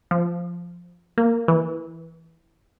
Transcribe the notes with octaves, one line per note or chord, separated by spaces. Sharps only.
F3
A#3
E3